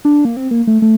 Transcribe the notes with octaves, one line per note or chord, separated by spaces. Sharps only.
D4
A#3
C4
A#3
A3
A3